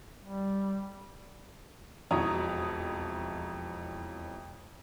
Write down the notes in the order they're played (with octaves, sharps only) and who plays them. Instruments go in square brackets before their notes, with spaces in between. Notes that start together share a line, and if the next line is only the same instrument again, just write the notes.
[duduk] G3
[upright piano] E1 F2 E4 C#5 A#5 D#6